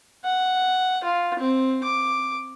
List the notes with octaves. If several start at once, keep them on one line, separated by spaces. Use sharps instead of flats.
F#5
F4
C4
D6